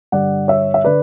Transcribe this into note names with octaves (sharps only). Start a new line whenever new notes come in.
G2 D3 G3 D5 F#5
C#5 E5
E5
D3 B4 D5